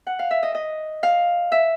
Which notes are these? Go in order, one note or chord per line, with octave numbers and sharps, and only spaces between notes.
F#5
F5
E5
D#5
D#5
F5
E5